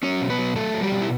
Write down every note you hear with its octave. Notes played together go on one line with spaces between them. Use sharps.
F#3 C#4 C#5
B2
B3 B4
F#3
F#3 A3 A4
F#3
G3 G4
B2
E4